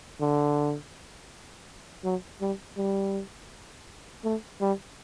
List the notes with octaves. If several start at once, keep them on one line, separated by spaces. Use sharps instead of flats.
D3
F#3
G3
G3
A3
G3